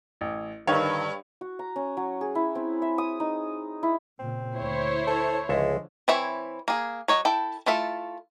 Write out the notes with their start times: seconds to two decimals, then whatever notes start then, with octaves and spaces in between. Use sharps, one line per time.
0.21 A1
0.67 G2 D3 D#3 B4 C#5 F5
1.41 F#4
1.59 A#5
1.76 C#4
1.97 F#3
2.21 G#4
2.35 E4
2.55 C4
2.82 E5
2.98 D#6
3.20 D#4
3.83 E4
4.19 A#2 C#3 C4
4.56 D2 E4 C5 C#5
5.07 A4
5.49 C#2 D3 F3 G#3 A4 E5
6.08 E3 C4 E4 C#5 E5
6.68 A#3 G#4
7.08 F#3 C#5 D#5
7.25 E4 A4 G5
7.66 A3 E4 F4 A4 E5